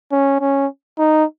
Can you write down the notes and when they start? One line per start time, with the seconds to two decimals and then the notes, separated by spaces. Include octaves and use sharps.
0.12 C#4
0.41 C#4
0.99 D#4